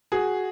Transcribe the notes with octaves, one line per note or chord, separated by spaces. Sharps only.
F#4 G#4